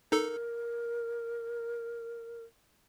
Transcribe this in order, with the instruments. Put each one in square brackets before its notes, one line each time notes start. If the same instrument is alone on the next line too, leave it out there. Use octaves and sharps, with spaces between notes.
[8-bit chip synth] D#4 A4 [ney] A#4